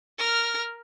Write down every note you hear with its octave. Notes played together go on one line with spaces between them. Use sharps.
A#4 F6